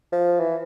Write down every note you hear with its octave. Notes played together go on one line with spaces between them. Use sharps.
F3
E3